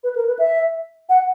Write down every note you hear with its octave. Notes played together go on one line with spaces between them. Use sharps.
B4
A#4
B4
E5
F#5